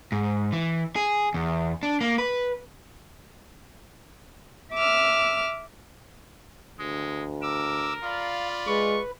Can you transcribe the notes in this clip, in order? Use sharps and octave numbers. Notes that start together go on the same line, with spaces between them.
G#2
E3
G#4
E2
D4
A#3
B4
E5 D6 E6 F6
D2 G#3
A#4 D6 E6
F4 D5 F5 B5
G#3 B4 C#6